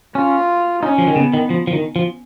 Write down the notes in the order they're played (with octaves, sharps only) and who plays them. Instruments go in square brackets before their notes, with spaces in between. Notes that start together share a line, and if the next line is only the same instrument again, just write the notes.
[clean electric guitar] C#4 [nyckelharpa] F4
[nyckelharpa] C#4 [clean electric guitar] D#4
[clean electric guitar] F3
D#3
[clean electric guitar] C#3 [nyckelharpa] B3
[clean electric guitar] D#3
F3
F3
D#3
F3